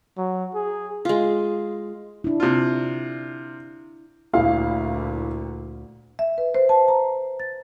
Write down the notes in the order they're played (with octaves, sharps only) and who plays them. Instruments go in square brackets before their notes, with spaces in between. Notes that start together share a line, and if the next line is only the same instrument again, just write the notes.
[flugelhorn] F#3
G#4
[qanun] G#3 F4
[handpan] D4 E4
[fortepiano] C3 F4
[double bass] D2 A#2 [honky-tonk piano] E4 F5
[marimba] E5
B4
C5
A5
A#5
A6